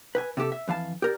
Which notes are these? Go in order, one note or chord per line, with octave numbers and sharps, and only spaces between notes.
B4 G5 G#5
C3 F#4 G4 A4
E5
F2 E3 F5 A5
G4 A#4 D5